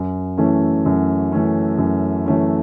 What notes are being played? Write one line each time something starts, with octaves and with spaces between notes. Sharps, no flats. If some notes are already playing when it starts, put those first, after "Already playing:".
Already playing: F#2
E3 A3 C#4
F#2
E3 A3 C#4
F#2
E3 A3 C#4